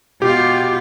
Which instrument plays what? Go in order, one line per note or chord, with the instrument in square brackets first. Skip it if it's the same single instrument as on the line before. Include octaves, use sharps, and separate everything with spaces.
[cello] B2 F4 [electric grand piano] G4